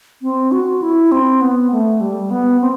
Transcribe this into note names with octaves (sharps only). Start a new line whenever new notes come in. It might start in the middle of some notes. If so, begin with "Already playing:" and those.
C4
F#4
E4
C4
B3
A3
G3
B3
C4